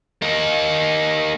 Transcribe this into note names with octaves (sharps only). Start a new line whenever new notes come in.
A#3 D#4